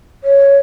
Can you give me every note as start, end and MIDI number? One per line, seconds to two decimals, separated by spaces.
0.24 0.58 73